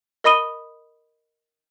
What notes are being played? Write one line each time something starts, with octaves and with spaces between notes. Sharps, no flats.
A#4 D#5 B5 D#6 D#7 G7